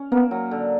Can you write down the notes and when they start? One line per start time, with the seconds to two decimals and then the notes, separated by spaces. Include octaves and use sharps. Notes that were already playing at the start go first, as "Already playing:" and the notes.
Already playing: C#4
0.12 A#3 B3
0.31 F#3
0.51 D3